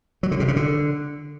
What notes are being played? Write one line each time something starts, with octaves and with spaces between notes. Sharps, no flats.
F#3
D3
C3
C#3
D3